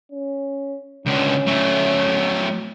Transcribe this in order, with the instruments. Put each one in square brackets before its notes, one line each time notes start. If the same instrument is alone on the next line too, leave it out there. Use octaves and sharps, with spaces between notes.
[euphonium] C#4
[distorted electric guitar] C#2 D3 [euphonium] C#4
[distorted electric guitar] F#3 A3